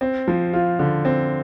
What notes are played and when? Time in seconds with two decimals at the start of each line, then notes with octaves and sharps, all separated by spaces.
0.01 C4
0.28 F3
0.53 F4
0.79 D3
1.05 C4